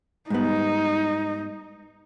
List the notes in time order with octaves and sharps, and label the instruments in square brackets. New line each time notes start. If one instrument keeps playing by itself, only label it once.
[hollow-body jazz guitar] G#2 G3 B3 [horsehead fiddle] D#4